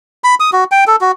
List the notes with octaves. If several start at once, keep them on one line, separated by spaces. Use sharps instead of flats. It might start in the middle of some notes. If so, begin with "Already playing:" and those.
B5
D#6
F#4
G5
A4
F#4